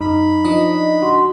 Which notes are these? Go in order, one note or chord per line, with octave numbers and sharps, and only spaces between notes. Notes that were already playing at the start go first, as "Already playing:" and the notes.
F#2 D#4 B5
F3 D4 D#5
F#4 C6